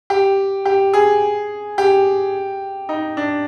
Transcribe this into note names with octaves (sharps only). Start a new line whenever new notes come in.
G4
G4
G#4
G4
D#4
D4